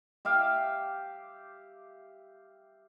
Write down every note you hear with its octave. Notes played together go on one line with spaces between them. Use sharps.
G4 E5 F5